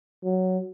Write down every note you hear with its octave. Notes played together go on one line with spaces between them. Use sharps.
F#3